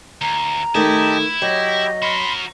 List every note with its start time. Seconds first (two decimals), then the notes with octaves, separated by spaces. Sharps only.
0.22 D2 A#5
0.75 D#3 A3 E4 G4 D#5 A5
1.42 F#3 G4 D#5
2.02 F#4 A#4 B5 C6